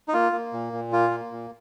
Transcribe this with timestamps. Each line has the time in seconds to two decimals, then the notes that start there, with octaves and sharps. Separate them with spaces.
0.08 D#4
0.13 A#3 F4
0.33 A#3
0.53 A#2
0.73 A#2
0.92 A#3 F4
1.11 A#3
1.31 A#2